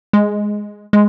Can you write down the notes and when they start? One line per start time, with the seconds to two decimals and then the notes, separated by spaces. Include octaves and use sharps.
0.13 G#3
0.93 G#3